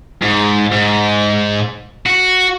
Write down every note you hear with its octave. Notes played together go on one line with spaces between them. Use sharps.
G#2
G#2
F#4